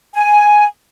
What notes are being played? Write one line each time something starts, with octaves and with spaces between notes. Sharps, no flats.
G#5